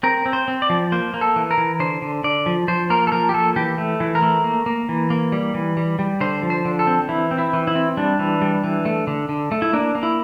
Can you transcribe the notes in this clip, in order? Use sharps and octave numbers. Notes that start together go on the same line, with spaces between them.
C4 A#4
C4
C5
C4
D5
F3
A#3 C5
A#3
A4
E3
A#4
E3
D3 C5
D3
D3 D5
F3
F3 C5
A#3 A#4
A4
F3 A#4
G4
A#3 A4
E3 G4
A3
E3
A#4
A3
A#3
A#3
E3
A#3
G3
E3
G3
G3
D3 C5
F3
C5
D3
A4
C4
E3 E4
C4
E4
E3
E4
C4
G3 D4
E3
G3
E3
A3
D3
D3
A3
E4
A#3 D4
A#3
E4